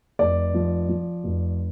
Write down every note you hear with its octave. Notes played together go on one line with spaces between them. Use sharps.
F1 D5
F3
F3
F1